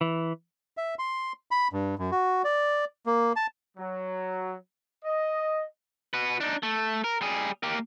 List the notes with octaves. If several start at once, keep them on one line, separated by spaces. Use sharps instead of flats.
E3
E5
C6
B5
G2
F#2
F#4
D5
A#3
A5
F#3
D#5
F#4 B4
D4 D#4
A3
A#4
G3 G#4
A#3 G4